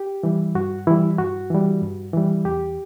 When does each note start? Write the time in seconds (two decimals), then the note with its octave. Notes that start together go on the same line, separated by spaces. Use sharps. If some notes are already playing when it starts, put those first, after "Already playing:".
Already playing: G4
0.23 E3 G3
0.55 G2 F#4
0.87 E3 G3 E4
1.19 G2 F#4
1.50 E3 G3
1.82 G2
2.13 E3 G3
2.45 E2 G4